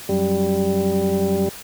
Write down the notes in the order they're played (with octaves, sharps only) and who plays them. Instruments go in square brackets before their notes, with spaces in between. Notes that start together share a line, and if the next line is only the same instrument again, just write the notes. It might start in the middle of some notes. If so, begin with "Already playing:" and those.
[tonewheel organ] F#2 G3